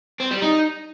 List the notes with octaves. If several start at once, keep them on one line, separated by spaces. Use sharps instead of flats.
C4
G3
D#4